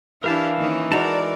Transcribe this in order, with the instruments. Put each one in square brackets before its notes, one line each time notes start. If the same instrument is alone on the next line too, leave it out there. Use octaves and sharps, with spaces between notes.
[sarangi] E3 [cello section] D4 E4 G4 [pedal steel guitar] A#4 F5 A5
[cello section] D#3 A#3 C#4
[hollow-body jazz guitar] G#3 D#4 F#4 [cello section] A#4 D5 [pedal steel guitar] A5 A#5